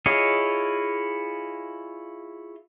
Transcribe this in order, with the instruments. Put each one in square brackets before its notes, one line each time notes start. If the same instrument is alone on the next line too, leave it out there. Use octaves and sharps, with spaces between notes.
[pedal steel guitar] E4 F4 G#4 C#5 D#5